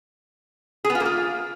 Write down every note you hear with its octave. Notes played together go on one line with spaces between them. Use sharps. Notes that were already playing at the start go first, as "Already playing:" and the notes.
G#4
B3
F4
A#3
F4